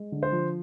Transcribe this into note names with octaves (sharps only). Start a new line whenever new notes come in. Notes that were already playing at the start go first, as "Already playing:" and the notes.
Already playing: G#3
D3
C5
F3